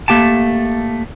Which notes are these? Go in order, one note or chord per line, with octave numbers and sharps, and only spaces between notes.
A3 A#3 G4 G5 A5